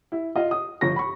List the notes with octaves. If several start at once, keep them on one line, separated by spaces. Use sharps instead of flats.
E4
F4 D#5
D#6
G1 F3 C#6 A#6
B5 C#6